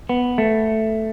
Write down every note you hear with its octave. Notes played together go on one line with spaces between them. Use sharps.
B3
A3